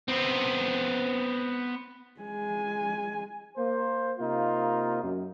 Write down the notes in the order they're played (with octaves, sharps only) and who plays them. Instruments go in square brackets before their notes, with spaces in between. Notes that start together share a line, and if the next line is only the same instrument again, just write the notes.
[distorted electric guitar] B3 C4
[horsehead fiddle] G#3 G#5
[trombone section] A#3 C5
C3 A#3 D#4 F4
F#2